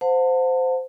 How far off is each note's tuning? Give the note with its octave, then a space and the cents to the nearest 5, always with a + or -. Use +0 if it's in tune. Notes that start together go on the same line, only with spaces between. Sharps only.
C5 -15 F#5 -40 A5 +30